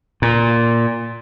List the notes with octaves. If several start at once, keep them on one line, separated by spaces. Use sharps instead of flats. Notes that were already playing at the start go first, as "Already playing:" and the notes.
A#2